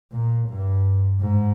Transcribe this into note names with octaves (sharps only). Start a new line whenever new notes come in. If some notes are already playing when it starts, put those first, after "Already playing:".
A#2
G2
G#2